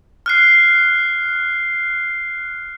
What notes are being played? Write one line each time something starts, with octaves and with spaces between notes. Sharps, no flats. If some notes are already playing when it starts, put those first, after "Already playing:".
F6 F#6 C7